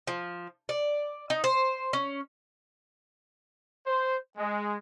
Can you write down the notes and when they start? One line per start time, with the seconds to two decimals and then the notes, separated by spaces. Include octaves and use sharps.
0.07 F3
0.69 D5
1.30 D#4
1.44 C5
1.93 C#4
3.86 C5
4.38 G#3